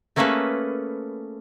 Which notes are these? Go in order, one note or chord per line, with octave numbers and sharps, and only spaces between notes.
A3 A#3 C#4 G#4 A4 B4